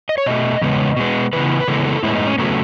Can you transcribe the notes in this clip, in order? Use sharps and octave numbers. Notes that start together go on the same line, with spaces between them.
D#5
C#5
B2 A3 D#5
E2 C#3 G#3 B3
B2 G#3 B3
C#3 E3 B3 B4
B4
C#3 E3 G#3 B3 A4
A4
A2 G#3 B3 E4
D#4
C#4
C#3 F#3 A3 B3